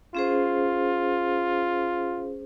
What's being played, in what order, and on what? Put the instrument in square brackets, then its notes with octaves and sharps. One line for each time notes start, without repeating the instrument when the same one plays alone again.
[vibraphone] C#4 G#4 C5 [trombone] F4